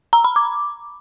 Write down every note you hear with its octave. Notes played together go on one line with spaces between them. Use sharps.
A#5
B5
D6